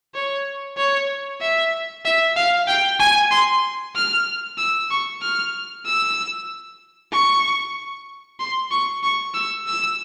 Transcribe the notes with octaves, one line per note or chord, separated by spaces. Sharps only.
C#5
C#5
E5
E5
F5
G5
G#5
C6
F6
E6
C#6
F6
E6
C#6
C6
C#6
C#6
E6
E6